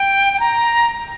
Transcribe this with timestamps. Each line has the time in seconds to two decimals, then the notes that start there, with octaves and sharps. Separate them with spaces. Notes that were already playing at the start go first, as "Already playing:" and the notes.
Already playing: G5
0.33 G5
0.40 A#5